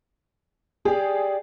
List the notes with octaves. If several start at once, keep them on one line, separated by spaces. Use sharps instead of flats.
G4 G#4 D5